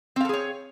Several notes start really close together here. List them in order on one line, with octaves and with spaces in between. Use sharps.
C4 F5 A4 G#4 C#5